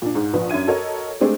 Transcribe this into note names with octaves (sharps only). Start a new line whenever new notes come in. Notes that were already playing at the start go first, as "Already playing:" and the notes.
A#2 D4
G#2
A#1 B4
F#2 D4 E5 G#6 D#7
F#4 A4 A#4 C#5 D#5
G#3 A3 C4 D4 G4